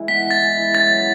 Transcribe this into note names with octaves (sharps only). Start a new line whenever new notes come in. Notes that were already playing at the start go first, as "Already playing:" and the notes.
Already playing: E3 G#3 E4
B3 B6
E3 A6
G#3
E4
C#4 A6
F#3